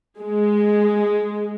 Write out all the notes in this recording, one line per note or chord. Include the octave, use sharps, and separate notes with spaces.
G#3